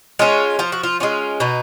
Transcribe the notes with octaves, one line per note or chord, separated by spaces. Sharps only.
G#3 C#4 F4
F3 F4
F#4
F4
G#3 C#4 F4
B2 D#4